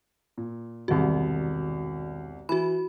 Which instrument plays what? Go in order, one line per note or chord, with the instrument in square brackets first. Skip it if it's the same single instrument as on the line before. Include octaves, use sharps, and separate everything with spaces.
[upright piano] A#2
[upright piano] E1 C2 [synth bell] D#3 F#4
[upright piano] E3 [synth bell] F#4 B5